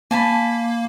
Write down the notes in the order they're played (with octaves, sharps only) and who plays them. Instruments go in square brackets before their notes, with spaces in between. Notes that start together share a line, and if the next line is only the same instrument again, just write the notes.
[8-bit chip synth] A#3 [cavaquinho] G#5 A5 B5